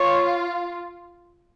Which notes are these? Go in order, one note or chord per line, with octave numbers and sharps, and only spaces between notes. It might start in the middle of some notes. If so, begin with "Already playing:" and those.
Already playing: F4 C#5